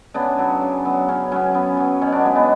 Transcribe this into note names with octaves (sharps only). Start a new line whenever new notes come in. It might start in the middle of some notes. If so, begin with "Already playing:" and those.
C#3 B3 D4
F#3 B3
C#3
F#3 B3
C#3 C#4
F#3 B3 C#4
C#3 B3
F#3 B3
B2 C#4
B3 D4
G#3 B3
B3 D4